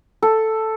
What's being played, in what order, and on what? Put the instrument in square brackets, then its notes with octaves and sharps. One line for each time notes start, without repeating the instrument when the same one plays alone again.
[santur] A4